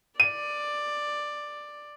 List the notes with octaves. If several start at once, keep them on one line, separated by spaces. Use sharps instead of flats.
D5 D#7